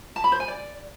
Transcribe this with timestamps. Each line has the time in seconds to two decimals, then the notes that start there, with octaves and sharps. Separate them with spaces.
0.16 A5
0.24 B5
0.32 C5
0.40 G#5
0.48 D5